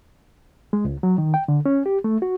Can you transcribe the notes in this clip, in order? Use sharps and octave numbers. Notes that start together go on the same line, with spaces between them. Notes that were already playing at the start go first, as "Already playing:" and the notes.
G#3
C#2
F#3
D#3
G5
D3
C#4
G4
A3
F#4